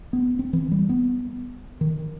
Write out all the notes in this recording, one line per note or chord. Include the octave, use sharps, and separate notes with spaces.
B3
C4
E3
G3
B3
D#3